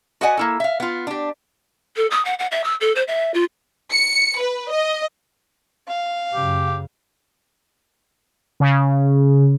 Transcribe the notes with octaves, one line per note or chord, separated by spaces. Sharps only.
F#4 B4 D5 D#5 F#5 G#5
A#3 E4 A4
E5 F5
B3 F4
D4 G4
A4
D#6
F#5
F#5
E5
E6
A4
C5
E5
F4
C#7
B4
D#5
F5
F#2 C#3 G4
C#3